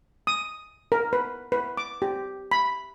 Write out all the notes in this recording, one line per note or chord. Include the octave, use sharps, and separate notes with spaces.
D#6
A#4
B4
B4
D6
G4
B5